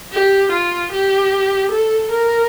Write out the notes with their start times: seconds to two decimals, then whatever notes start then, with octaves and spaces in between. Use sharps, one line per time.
0.12 G4
0.52 F4
0.92 G4
1.72 A4
2.11 A#4